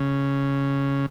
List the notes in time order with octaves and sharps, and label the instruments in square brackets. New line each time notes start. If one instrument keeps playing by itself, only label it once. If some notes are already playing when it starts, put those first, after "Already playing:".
Already playing: [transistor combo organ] C#3